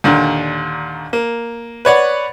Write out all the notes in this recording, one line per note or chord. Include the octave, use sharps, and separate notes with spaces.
D#2 A#2 D3
A#3
B4 C#5 D5 F#5